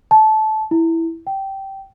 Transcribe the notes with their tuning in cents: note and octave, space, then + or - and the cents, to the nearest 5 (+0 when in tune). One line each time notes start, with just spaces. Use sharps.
A5 -20
E4 +0
G5 -15